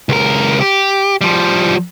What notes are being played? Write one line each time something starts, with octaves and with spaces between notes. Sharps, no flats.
C#2 A#4
G4
F3 G3